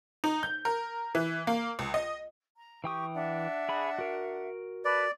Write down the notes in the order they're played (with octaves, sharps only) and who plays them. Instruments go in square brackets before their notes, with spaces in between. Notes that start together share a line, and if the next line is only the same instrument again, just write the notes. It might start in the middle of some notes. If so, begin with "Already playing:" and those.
[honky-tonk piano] D#4
G6
A#4
E3
A#3
C#2
D#5
[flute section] A#5
[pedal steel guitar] E3 G5 D#6 [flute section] G4 C#6
[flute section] D4 E5 F#5
[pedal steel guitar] G#4 B5
F#4 A#4
[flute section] B4 A5 B5 [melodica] D5